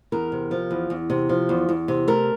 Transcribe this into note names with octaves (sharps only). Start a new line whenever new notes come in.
E2 A#4
C3
F3
E2
E2
C3
F3
E2
E2
C3
A3 A#4